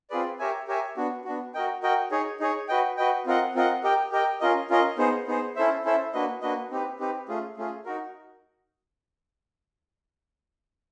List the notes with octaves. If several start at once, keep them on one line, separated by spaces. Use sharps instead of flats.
C4 F4 G#4 B4 D5
G4 A#4 C#5 E5 G#5
G4 A#4 C#5 E5 G#5
B3 D4 F#4
B3 D4 F#4
F#4 A#4 D#5 G5
F#4 A#4 D#5 G5
D#4 G#4 C#5
D#4 G#4 C#5
F#4 B4 D#5 G5
F#4 B4 D#5 G5
C4 F4 A#4 D#5 F#5
C4 F4 A#4 D#5 F#5
G4 A#4 D#5 G5
G4 A#4 D#5 G5
C#4 F4 A#4 D#5
C#4 F4 A#4 D#5
B3 D#4 G#4 C5
B3 D#4 G#4 C5
C#4 E4 A4 C5 E5
C#4 E4 A4 C5 E5
A#3 D4 F#4 B4 D#5
A#3 D4 F#4 B4 D#5
C4 D#4 G4 B4
C4 D#4 G4 B4
A3 C#4 F4 G#4
A3 C#4 F4 G#4
D#4 F#4 A#4